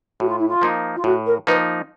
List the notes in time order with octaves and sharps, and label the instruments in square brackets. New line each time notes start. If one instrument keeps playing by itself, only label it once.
[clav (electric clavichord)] A2 [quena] F#4
[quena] F4
E4
F4
[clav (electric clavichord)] F3 A#3 D#4
[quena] F4
[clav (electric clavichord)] A2 [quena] F#4
[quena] A#4
[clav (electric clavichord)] F3 A#3 D#4 [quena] B4